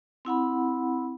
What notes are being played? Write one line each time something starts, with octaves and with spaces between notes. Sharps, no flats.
C4 E4 F#5 B5